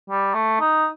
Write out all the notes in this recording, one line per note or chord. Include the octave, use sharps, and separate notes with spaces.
G3
A3
D#4